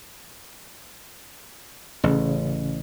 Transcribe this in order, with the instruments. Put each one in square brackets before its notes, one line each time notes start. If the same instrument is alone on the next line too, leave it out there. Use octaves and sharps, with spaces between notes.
[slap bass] A1 [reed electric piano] C#3